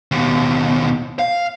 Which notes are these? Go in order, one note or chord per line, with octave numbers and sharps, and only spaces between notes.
D#2 B2
F5